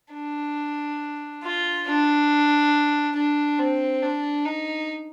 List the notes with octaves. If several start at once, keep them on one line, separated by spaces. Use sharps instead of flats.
D4
F4
D4
D4
C4
D4
D#4